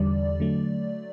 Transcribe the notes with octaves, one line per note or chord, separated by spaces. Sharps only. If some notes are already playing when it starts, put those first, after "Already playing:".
Already playing: E2 D3 G3 D5
D3 F#3 A3